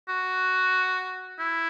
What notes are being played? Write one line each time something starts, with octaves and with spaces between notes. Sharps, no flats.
F#4
E4